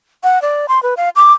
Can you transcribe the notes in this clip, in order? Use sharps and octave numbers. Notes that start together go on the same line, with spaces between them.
F#5
D5
C6
B4
F5
D6